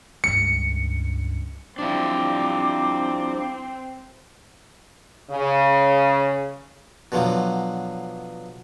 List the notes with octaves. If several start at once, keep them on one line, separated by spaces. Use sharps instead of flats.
C#2 G2 C#7
F3 G3 C4 D4 E4 D6
C#3
B2 D3 F3 F#3